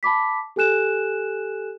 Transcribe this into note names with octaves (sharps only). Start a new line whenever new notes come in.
A5 B5 D6 B6
G4 A4 G#5 F#6 E7